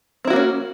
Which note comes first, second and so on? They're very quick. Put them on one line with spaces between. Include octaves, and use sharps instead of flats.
C4 E4 F#4 A#3 C#4